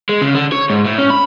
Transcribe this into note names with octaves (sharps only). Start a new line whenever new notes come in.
G#3
C#3
D3
C#5
G#2
A2
C#4
B5